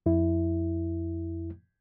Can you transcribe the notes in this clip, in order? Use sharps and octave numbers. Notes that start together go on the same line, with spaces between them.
F2 E4